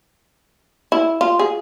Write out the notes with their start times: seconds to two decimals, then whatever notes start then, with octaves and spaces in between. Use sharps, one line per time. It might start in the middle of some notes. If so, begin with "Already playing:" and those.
0.92 E4
1.21 F4
1.39 G#4